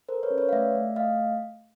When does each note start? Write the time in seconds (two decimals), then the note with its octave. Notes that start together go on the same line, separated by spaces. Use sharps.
0.09 A4 A#4 C5
0.23 B4 C#5
0.30 C#4
0.38 B4 C#5
0.49 F5
0.52 A3 D5 E5
0.75 A3
0.96 A3 D#5 F5